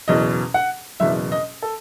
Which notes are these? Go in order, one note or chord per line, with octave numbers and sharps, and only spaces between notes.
F#1 E2 B2 D#5
F#5
F#1 E2 B2 E5
D#5
A4